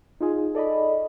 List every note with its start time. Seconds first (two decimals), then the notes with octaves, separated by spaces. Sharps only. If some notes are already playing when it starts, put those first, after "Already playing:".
0.20 D#4 F4 G#4
0.55 A4 D5 D#5 B5